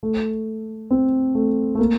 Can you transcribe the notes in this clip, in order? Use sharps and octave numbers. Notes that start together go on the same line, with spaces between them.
A3
C4
A3
A3
A#3